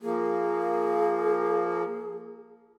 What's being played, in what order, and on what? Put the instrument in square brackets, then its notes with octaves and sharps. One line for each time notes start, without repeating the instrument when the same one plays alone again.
[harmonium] F3 A#3 [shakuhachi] G#4